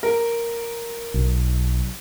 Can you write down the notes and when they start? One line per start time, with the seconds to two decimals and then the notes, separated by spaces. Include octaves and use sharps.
0.03 A#4
1.14 B1